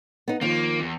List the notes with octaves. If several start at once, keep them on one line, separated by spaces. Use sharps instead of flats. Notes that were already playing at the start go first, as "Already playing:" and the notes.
B3 D#4
D#2 D#3 F3 A#3
E2